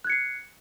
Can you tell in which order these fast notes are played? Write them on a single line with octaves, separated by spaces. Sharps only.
F#6 G#6 C#7 C7